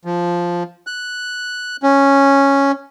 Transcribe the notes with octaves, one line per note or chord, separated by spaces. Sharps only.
F3
F#6
C#4